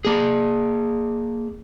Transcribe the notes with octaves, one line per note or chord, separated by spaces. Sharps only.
A#3 G#4